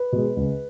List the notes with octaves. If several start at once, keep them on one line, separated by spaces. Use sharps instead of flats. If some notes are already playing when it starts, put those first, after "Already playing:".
Already playing: B4
B2 G#3
C#2